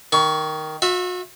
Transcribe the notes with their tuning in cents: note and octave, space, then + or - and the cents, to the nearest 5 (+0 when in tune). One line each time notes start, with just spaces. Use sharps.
D#3 +0 C#6 +25
F#4 -40 E5 +0